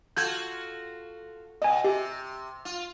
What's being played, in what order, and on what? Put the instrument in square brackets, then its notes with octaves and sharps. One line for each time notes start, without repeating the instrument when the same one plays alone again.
[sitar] F4 F#4 A4 [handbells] G6 G#6
[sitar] B2 [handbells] D#5 G#5
[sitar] C3 [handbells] G4
[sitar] F4